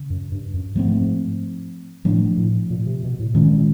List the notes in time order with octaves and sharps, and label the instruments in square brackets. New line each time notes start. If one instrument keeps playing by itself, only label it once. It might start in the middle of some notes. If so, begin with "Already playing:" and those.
Already playing: [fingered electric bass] C#3
[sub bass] F#2
G2
F#2
[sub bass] G#2 [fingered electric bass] F3 A3 C4
[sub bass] A2 [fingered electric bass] F3 A3 D4
[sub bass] A2
A#2
C3
B2
A2
[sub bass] A#2 [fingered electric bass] D#3 G#3 C#4